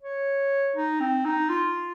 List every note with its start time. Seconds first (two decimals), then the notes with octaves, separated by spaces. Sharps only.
0.02 C#5
0.76 D#4
1.00 C4
1.25 D#4
1.49 F4